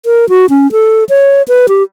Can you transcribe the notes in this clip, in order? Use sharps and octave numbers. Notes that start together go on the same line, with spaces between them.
A#4
F#4
C#4
A4
C#5
B4
G4